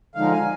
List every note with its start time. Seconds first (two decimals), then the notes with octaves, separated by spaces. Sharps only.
0.15 D3 F3 G#3 D#4 F5
0.32 G#5